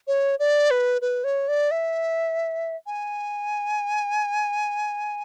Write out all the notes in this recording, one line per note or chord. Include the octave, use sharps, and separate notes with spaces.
C#5
D5
B4
B4
C#5
D5
E5
G#5